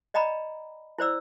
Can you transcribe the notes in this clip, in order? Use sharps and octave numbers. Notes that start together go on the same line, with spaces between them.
D5 D#5 G5 A#5 B5
E4 C5 D5 E6